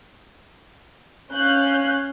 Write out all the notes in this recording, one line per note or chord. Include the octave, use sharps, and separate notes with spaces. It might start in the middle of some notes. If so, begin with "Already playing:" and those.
C#4 F5 F#6 G6